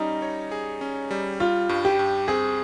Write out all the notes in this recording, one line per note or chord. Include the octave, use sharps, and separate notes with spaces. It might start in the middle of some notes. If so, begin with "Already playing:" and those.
Already playing: G3 C#4 D#4
C#5
G#4
C#4
G3
G3 F4
G2
G4
G2
C4 G#4